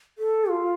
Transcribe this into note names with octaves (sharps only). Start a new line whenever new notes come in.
A4
F4